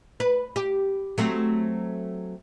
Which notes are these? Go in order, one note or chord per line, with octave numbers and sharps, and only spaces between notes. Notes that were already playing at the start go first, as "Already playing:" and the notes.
B4
G4
F#3 A3 C4